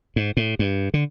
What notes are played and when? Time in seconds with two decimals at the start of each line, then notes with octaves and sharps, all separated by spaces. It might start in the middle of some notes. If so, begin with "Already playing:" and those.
0.16 G#2
0.37 A2
0.59 G2
0.94 D3